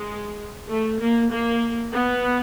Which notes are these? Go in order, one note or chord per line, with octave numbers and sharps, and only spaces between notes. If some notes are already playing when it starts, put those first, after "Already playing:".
Already playing: G#3
A3
A#3
A#3
B3